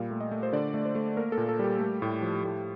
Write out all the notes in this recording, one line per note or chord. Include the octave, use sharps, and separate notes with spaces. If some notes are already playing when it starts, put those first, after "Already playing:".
Already playing: A#2 G3 F5
A3
D#5
A3
C5
D3 D5
A3
C5
A3
A#3 A#4
A4
A#2
A4
G3 G4
A3
A2
F3
A2